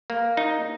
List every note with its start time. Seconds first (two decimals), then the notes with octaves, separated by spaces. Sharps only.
0.10 A#3
0.37 D#4